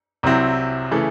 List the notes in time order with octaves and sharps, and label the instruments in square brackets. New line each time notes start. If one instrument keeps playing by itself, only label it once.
[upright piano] C2 C3 F#3 C4 E4
C#3 E3 A3